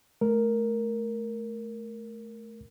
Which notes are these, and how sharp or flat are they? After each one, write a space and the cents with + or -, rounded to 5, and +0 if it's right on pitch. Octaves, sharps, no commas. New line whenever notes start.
A3 -20 A#4 +0